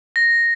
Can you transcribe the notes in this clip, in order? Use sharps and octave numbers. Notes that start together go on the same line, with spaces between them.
A#6